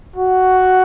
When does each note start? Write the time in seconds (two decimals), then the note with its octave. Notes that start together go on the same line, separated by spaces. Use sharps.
0.16 F#4